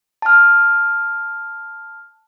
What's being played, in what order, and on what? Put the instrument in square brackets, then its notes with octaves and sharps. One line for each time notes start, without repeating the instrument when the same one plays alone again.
[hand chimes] A5 F6